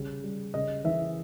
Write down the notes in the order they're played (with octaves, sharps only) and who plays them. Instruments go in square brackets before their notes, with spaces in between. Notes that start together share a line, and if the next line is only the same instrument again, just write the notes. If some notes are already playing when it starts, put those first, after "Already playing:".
Already playing: [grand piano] C#3 G3
G3
C#3 D#5
E3 E5